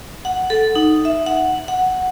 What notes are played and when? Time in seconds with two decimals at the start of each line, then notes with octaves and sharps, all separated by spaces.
0.25 F#5
0.50 A4
0.75 D#4
1.05 E5
1.26 F#5
1.68 F#5